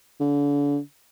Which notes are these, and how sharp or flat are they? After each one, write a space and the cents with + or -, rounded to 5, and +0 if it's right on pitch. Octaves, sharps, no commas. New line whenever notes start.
D3 -40